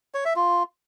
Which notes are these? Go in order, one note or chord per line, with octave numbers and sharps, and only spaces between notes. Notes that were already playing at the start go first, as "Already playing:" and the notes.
C#5
E5
F4